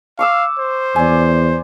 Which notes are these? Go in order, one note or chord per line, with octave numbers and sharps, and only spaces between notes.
F5 C#6 D6 E6
C5
E2 D5 G#5